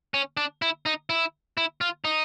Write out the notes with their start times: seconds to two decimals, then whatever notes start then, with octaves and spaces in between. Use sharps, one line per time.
0.14 C#4
0.37 D4
0.62 E4
0.86 D#4
1.10 E4
1.57 E4
1.81 F4
2.05 D#4